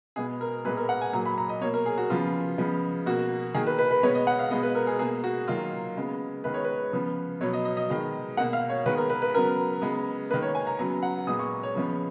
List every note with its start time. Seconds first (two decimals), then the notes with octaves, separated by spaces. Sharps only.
0.16 B2 G#3 B3 G#4
0.41 A#4
0.65 A#2 G#3 B3 B4
0.77 A#4
0.89 F#5
1.01 G#5
1.13 A#2 F#3 A#3 A#5
1.26 B5
1.38 A#5
1.49 D#5
1.61 B2 A#3 C#5
1.74 A#4
1.86 G#4
1.98 F#4
2.10 C#3 F3 B3 F4
2.58 C#3 F3 G#3 B3
3.06 B2 A#3 F#4
3.54 D#3 A#3 G#4
3.67 B4
3.79 B4
3.91 B4
4.03 B2 G#3 B3 C#5
4.15 D#5
4.27 F#5
4.39 F5
4.51 B2 G#3 B3 D#5
4.63 B4
4.75 A#4
4.87 G#4
4.99 B2 A#3 G#4
5.24 F#4
5.48 D#3 F#3 A#3 F4
5.96 C#3 G#3 B3
6.44 D#3 G#3 B3 B4
6.54 C#5
6.65 B4
6.92 C#3 F3 B3
7.41 B2 F#3 B3 C#5
7.53 D#5
7.65 D#5
7.77 D#5
7.89 D#3 G#3 B3
8.37 A#3 F#5
8.40 B2
8.53 F5
8.70 C#5
8.86 D#3 G#3 B3 B4
8.98 A#4
9.10 B4
9.22 B4
9.34 C#3 F#3 B3 A#4
9.82 C#3 G#3 B3
10.30 A#3 B4
10.34 D#3
10.42 C#5
10.55 G#5
10.67 A#5
10.79 C#3 F#3 B3 A#5
11.03 F#5
11.27 A#2 G#3 B3 D#6
11.39 C#6
11.63 C#5
11.75 C#3 F3 G#3 B3